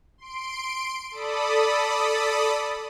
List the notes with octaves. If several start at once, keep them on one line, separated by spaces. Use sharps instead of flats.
C6 D7
A4 D5 B5 D#6